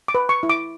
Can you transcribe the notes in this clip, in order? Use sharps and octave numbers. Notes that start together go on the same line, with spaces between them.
D6
B4
C#6
E4
D6